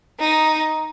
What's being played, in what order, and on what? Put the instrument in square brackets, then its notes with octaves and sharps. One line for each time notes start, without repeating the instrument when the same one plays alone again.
[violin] D#4